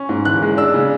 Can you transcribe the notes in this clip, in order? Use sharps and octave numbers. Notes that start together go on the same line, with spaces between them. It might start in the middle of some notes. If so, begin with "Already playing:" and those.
Already playing: C#4
G#2
E3 F#6
G#3
D4 E6
C#3